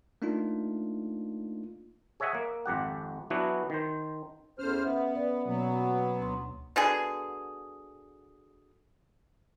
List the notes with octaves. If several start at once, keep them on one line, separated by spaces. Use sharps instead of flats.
A3 A#3 D4 D#4 F4
G#4 C#5 D#5 E5 F#5 G#5
A#3
G#1 F2 G4 F#5
E3 F#3 B3 D4 E4 F#4
D#3 C5
E2 C#4 A4 C5 F6
B3 E5
B4 D5
B2 F#3 A#3 B3
D2 C6
B2 D3 G#4